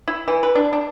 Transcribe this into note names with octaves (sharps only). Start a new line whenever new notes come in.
E4
E3
B4
D4
D4